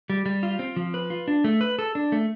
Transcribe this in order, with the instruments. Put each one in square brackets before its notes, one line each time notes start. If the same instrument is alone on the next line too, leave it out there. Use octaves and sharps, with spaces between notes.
[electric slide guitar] G3
G3
F4
C4
F3
B4
F4
D4
A3
B4
A4
D4
A3